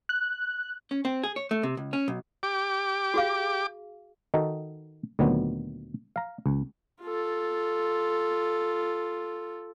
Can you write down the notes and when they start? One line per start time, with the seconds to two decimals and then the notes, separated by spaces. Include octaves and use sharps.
0.09 F#6
0.91 C#4
1.05 C4
1.23 G#4
1.36 C#5
1.51 A3
1.63 C3
1.77 C#2
1.93 C#4
2.08 B1
2.43 G4 D6
3.14 F#4 G#4 F5
4.34 D#3 D#4 F#4 A4
5.19 D2 A#2 D#3 F#3 B3
6.16 F5 A#5
6.46 C#2
7.02 F4 A4